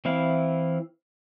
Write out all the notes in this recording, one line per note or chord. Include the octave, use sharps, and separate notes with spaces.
E3 C4 E4 F5